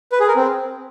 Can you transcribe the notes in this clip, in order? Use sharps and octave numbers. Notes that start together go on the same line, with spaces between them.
B4
G#4
A#4
C4